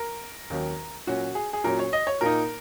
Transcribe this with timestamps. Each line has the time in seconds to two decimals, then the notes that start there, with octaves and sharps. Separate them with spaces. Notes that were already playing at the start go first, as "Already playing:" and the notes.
Already playing: A#4
0.50 D#2 D#3 F#3 C#4
1.07 A#2 F#3 C#4 F#4
1.35 G#4
1.53 G#4
1.64 A#2 F#3 C#4 A#4
1.79 C#5
1.93 D#5
2.07 C#5
2.21 A#2 A#3 D#4 A#4